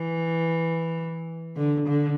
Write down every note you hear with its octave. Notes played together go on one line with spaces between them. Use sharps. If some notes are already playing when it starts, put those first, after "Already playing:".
Already playing: E3
D3
D3